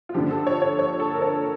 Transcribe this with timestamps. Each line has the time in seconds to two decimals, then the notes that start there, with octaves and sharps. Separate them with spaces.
0.09 F4
0.14 G2 D3 F3 G4
0.31 A4
0.47 C#5
0.62 C#5
0.79 C#5
1.00 A4
1.14 A#4
1.22 C#5